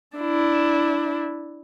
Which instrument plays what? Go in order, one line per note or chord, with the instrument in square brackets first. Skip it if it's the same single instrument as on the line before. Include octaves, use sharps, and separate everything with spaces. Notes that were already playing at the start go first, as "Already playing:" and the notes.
[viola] D4 E4